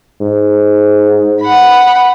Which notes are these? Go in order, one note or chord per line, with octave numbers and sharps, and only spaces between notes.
G#2
F#5 B5